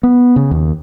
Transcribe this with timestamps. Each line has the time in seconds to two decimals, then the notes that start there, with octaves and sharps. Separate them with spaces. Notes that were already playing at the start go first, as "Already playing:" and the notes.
0.03 B3
0.36 C#3
0.51 D#2